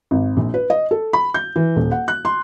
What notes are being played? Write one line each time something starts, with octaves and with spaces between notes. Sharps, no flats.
G#1
A#1
B4
D#5
A4
B5
G6
E3
D#1
F#5
F#6
C6